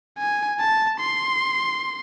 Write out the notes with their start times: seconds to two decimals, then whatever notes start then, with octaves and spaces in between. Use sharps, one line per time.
0.18 G#5
0.59 A5
1.00 C6